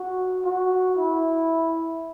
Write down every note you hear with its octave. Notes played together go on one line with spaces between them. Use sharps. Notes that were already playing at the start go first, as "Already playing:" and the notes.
Already playing: F#4
F#4
E4